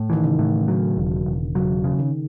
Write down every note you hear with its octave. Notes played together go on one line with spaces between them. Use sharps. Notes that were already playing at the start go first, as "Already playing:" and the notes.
Already playing: A2
D#3 E3
C#3
A2
F#3
E1
E1
C#3 F#3
C#3
D#3